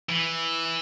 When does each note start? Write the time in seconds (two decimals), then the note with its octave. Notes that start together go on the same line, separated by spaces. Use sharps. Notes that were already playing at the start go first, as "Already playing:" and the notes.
0.09 E3